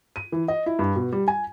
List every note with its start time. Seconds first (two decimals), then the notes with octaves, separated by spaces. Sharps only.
0.16 D#7
0.32 E3
0.48 D#5
0.66 E4
0.79 G2
0.96 B2
1.12 G3
1.28 G#5